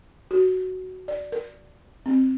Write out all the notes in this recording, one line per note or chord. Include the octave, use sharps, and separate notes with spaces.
F#4
D5
A#4
C4